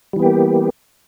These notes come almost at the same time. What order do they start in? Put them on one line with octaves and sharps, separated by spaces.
G3 E3 B3 G4 A#3